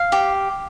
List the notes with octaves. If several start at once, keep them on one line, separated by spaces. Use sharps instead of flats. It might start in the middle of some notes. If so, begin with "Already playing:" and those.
Already playing: F5
G4